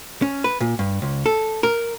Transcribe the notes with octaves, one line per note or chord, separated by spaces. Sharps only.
C#4
B4
A#2
G2
C#2
A4
A#4